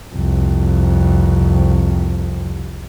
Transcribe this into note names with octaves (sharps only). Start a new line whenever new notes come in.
C2 F2